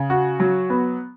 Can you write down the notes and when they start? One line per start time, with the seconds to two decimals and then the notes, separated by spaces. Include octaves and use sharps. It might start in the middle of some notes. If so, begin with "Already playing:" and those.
Already playing: C#3
0.10 F#4
0.40 F#3
0.70 B3